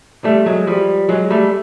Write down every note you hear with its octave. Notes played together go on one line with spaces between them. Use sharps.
G3 A3
F#3 G#3
F3 G3
F#3 G#3
G3 A3